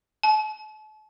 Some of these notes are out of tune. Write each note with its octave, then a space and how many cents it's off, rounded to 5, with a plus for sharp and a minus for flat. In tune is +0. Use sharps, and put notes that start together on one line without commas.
A5 -40